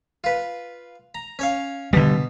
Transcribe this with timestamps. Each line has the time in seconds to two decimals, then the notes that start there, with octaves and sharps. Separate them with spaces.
0.24 F4 B4
1.15 A#5
1.39 C#4 C#5 F5
1.93 B2 D3 G3